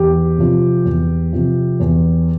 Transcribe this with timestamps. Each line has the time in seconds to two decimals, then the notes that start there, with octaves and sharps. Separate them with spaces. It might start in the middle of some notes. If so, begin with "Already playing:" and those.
Already playing: E2 G4
0.38 C3 F3
0.85 E2
1.33 C3 F3
1.80 E2